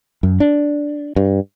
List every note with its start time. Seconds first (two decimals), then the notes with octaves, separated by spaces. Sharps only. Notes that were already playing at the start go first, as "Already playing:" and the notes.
0.23 F#2
0.40 D4
1.16 G2